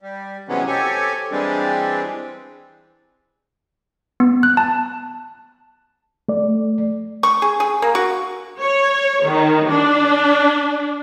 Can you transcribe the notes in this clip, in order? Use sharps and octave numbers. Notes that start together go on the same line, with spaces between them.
G3
C3 E3 F#3 G#3 B3 C#4
C4 G4 A4 C#5 G#5
E3 G3 G#3 C4 D4
B3
F#6
A5
A3 D5
C#6
G#4
G#4
A#3
F#4
C#5
D#3
D4